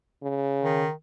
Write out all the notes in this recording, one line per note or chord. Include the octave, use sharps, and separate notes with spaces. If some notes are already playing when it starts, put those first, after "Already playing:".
C#3
D#3